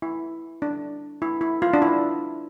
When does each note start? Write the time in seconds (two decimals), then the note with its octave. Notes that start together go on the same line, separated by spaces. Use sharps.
0.02 E4
0.62 D4
1.22 E4
1.41 E4
1.62 F4
1.73 D4
1.82 E4